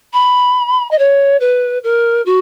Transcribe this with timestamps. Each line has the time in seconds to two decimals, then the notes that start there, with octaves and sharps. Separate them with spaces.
0.13 B5
0.91 D#5
0.99 C#5
1.40 B4
1.83 A#4
2.26 F#4